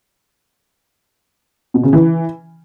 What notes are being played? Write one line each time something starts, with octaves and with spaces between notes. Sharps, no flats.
B2
C#3
E3